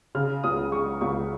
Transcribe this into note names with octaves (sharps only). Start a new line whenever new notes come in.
C#3 F6
C#2 D#6
G#3 C#6
C#2 C#6